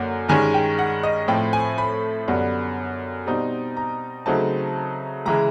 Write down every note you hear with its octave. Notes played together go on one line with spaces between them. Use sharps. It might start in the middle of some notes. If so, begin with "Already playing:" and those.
Already playing: F#2 D3 A#3 F#5
G2 D#3 G#3 C#4 G#5
G5
F#5
D#5
A2 F3 A3 C4 G5
G#5
B5
F#2 D3 G3 B3
B2 G3 C4 D#4
A#5
C#3 F#3 A3 C4 D#4 A5
C#3 E3 G#3 A#5